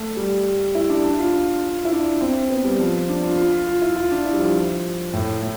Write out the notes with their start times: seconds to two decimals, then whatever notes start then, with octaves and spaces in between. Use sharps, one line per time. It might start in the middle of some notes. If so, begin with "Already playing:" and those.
Already playing: A3
0.17 G3
0.75 E4
0.90 D4
1.04 D4
1.19 F4
1.33 F4
1.85 E4
1.92 D4
2.21 C4
2.50 B3
2.64 G3
2.80 F3
3.09 D4
3.24 F4
3.37 F4
3.67 F4
3.82 E4
3.96 F4
4.11 D4
4.25 E4
4.33 G3
4.40 F3
5.13 A2
5.42 A2